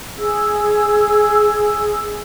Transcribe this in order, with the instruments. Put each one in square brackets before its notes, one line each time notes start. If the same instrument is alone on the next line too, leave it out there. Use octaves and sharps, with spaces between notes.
[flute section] G#4 E6